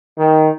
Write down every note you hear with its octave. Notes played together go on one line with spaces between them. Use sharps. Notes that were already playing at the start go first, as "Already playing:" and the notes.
D#3